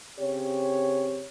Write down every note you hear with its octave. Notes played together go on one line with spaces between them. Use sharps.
C#3 C4 G4 C#5